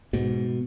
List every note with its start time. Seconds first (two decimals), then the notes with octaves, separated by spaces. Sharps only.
0.13 G#2 B2